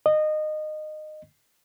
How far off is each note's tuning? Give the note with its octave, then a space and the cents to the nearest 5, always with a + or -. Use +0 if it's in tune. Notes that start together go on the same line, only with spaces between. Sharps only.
D#5 -20